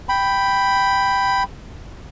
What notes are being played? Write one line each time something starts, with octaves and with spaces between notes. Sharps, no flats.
G5 B5